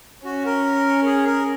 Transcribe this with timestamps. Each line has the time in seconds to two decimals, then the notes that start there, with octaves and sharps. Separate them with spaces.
0.24 C#4 F#4
0.45 A#4
1.06 G#4
1.26 A#4